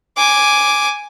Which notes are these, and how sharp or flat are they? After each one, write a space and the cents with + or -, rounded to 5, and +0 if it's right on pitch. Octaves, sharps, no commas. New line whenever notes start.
G#5 +0 D6 +0